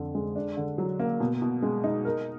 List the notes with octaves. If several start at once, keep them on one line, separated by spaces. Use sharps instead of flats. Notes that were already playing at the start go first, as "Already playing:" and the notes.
Already playing: F2 D3
G#3
D4
D3
F#3
A#3
B2
B2
G#3
D#4
A#4